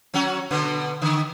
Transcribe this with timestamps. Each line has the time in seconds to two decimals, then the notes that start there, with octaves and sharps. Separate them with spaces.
0.14 F#3 C#4 F#4
0.51 B2 D3 B3
1.02 D3 D#3